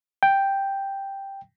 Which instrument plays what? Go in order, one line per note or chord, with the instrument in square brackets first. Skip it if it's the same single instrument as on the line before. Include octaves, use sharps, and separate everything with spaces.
[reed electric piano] G5